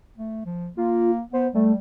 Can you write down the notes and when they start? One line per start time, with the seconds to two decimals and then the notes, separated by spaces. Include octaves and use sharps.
0.18 A3
0.45 F3
0.77 A#3 F4
1.33 B3 C5
1.55 G3 A3